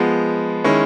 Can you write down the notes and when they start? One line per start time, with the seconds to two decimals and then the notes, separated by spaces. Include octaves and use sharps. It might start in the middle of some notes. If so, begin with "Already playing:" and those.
Already playing: F3 G#3 B3
0.64 D#3 G#3 C#4 E4